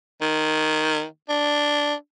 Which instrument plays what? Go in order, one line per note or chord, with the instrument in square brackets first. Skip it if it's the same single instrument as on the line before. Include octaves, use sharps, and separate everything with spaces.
[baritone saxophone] D#3
D4